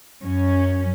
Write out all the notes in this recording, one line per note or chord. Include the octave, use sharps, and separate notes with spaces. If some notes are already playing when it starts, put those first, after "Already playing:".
F#2 C#4